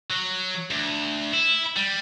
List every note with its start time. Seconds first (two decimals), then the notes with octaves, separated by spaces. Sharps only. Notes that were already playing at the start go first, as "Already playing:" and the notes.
0.11 F#3
0.71 D2
1.33 E4
1.76 G3